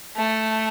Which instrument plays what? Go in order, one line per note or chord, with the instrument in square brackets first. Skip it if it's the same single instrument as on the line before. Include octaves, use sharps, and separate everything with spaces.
[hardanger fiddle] A3